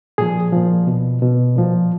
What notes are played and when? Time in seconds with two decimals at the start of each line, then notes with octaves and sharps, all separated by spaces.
0.18 A#2 F3 G#4
0.53 A#2 F3
0.87 B2
1.22 B2
1.56 A#2 F3